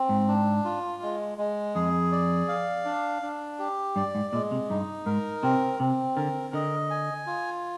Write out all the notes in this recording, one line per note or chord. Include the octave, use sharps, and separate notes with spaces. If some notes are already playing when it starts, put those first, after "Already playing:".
Already playing: C4
G#2
D4
F4
G#3
G#3
F2 G#4
D5
F5
D4
D4
G4
G2 D5
G#2
A#2 G#3
C3
G2 D#4
G#2 A#4
C3 C4
C3 C4
D3 A#4
D3 D#5
G#5
F4